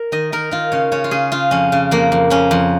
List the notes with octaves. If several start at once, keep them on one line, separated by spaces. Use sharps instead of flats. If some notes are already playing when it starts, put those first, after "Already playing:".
Already playing: A#4
D#3 D#5
D#3 A#4
D#3 F4
C#3 C#5
C#3 C#5
F4
C#3 G#4
C#3 F4
F2 C#4
C#3
F2 A#3
F2
F2 C#4
F2